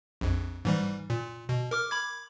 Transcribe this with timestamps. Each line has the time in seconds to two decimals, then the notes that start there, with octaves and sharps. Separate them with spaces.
0.21 A#1 F2
0.65 G#2 E3 G3
1.10 A#2
1.49 B2
1.71 A#4 D6 F6
1.91 B5 D6 G#6